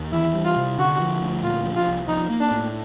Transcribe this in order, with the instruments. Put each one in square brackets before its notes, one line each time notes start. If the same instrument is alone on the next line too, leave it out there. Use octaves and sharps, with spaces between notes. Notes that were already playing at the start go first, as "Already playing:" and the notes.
Already playing: [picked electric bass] D#2
[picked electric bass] E3 [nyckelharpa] E4
[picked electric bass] G3
[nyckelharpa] F4
[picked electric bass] C3
[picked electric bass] D3 [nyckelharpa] F#4
[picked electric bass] F3
D2
[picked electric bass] A#2 [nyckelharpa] F4
[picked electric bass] F3
[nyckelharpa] F4
[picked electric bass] C2
[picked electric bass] F3 [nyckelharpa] D#4
[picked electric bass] A#3
[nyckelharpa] D4
[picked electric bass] A2